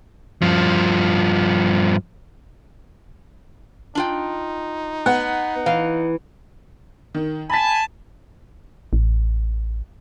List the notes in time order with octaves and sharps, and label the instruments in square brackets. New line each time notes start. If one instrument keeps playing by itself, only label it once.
[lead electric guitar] G2 F3
[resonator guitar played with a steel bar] D4 F4 G5 [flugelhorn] D#4
[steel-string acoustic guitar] B3 [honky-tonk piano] F#5
[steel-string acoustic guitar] E3 [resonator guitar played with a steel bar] F5
[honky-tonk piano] D#3
[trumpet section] G#5 A5 [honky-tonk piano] B5 B6
[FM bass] A1